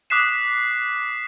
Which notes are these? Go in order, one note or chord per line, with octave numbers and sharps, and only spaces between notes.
D6 D#6 F#6 B6 C7 E7